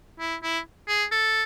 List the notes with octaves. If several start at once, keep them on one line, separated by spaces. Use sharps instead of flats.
E4
E4
G#4
A4